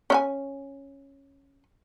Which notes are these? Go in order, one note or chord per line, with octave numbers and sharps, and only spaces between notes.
C#4 E5 G#5